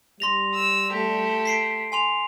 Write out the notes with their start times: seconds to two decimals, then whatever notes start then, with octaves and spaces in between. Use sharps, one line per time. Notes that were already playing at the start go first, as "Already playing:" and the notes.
0.20 G3 C6 A#6 F7
0.55 E6
0.92 A3 G4
1.45 B6 C7 D7
1.92 G#5 C6 F7